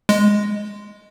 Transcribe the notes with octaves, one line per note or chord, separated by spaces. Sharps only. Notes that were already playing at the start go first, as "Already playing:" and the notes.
G#3